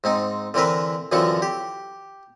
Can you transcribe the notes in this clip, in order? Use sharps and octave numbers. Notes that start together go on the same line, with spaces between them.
G#2 C4 D#4
D3 E3 C4 A#4 B4
F#2 D3 E3 F3 C4 C#6
G4